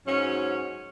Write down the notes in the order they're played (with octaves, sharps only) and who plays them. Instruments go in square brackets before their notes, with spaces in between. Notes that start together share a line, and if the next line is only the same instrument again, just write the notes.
[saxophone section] G#2 F#3 C#4